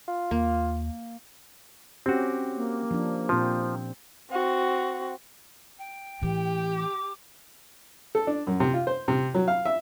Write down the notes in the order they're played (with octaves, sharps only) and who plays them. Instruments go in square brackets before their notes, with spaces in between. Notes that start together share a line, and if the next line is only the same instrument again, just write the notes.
[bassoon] F4
[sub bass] D#2 [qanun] A#3
[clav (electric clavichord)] C4 F#4 [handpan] C#4 G4
[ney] A#3
[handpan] F3 D4
[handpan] A#2 C4 C5 [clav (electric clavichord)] F3
[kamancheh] C4 F#4
[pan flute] G5
[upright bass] A2 E3 [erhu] G4
[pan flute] D6
[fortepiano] A4
D4
F#2
C3
F4
C5
C3
F#3
F5
E5